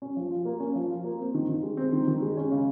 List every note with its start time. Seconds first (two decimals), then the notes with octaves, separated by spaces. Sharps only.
0.02 C#4
0.17 F3
0.31 F4
0.45 A#3
0.60 C#4
0.75 F3
0.90 F4
1.04 A#3
1.19 C4
1.34 D#3
1.49 D#3
1.63 G#3
1.77 C4
1.92 D#3
2.08 D#3
2.22 G#3
2.37 C#4
2.51 C#3